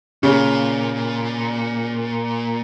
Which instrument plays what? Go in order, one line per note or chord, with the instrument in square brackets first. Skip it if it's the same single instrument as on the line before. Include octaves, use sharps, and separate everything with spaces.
[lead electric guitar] A#2 [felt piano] C#3